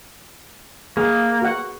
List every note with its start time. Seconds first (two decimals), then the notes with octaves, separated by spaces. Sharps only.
0.97 A#3 G#4
1.42 F#4 F#5